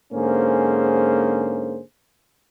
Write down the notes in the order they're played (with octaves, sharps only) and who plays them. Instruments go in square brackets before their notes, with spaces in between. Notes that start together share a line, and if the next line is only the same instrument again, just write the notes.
[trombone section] G#2 D3 A#3 C#4 G#4 C5